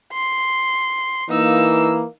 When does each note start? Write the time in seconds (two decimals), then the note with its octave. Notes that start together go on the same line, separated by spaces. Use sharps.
0.13 C6
1.29 E3 A#3 D#4 E6